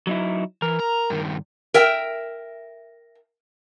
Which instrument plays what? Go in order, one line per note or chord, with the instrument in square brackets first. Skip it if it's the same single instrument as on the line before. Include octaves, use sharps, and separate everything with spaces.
[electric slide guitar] F#3 D#4 E4
[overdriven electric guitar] E3 [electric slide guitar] A#4
[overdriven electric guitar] A#5
G2 D#3
[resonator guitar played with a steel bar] A#4 E5 G5